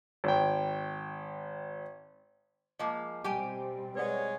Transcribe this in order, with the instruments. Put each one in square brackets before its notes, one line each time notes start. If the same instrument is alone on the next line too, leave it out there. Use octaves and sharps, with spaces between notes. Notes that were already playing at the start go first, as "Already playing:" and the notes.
[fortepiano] G#1 G5
[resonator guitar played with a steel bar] F3 G#3 A#3 [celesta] D#5 D6
[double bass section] B2 G3 C4 [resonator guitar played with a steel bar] G4 G5 G#5
[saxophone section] G#3 C#5 [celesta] B4 D5 F#5